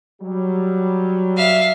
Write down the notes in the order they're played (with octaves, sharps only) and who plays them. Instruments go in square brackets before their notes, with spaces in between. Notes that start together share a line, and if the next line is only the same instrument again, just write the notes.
[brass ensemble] F#3 G3
[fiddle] E5 F5